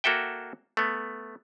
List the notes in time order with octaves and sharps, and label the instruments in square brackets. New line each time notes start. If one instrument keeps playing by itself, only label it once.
[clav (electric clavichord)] A#3 F#4 A4 E5 G5
A3 B3